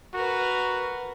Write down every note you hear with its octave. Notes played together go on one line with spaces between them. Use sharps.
F#4 A#4 B4